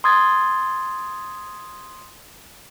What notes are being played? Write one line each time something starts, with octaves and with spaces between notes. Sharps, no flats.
C6 D#6 G#6 A6